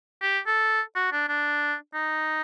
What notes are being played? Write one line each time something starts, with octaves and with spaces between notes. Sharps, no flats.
G4
A4
F#4
D4
D4
D#4